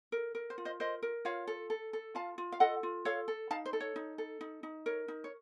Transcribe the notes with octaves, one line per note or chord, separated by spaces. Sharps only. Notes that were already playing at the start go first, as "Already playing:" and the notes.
A#4
A#4
C5
F4
C5 D#5
A#4 C5 D#5
A#4
F4 C#5 F5
A4
A4
A4
F4 F5 A5
F4
F5
A4 D#5 F#5
F4
A4 C#5 F5
A4
D#4 F5 A5
C5
A4
C#5
D#4
A4
D#4
D#4
A#4 C#5
D#4
C#5